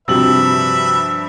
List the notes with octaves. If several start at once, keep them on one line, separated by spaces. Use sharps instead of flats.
G2 C3 F3 F#4 B4 E5 E6 F#7